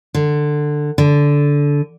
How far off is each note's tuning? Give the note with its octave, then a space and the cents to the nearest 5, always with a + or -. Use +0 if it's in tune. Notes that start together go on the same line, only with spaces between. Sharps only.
D3 +15
D3 -15